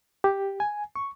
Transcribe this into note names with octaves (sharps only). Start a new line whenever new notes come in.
G4
G#5
C#6